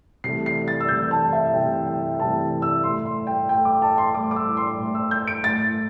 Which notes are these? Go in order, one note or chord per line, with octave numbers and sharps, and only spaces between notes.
C3 E3 A3 C7
C7
A6
E6
C3 E3 A3 G6
A5
E5
C3 E3 A3 G5
G5
C3 E3 A3 A5
E6
A2 A3 C6
C6
G5
A2 A3 G5
D6
A5
C6
A2 A3 D6
D6
E6
C6
A2 A3
E6
G6
D7
A2 A3 A6